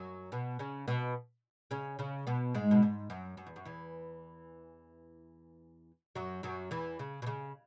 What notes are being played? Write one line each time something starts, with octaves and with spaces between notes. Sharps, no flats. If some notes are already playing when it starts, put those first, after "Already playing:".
Already playing: F#2 F#3
B2 B3
C#3 C#4
B2 B3
C#3 C#4
C#3 C#4
B2 B3
G#2 G#3
B2
G#2
F#2
F#2
E2
F#2
E2 E3
F#2 F#3
F#2 F#3
E2 E3
C#3
B2
C#3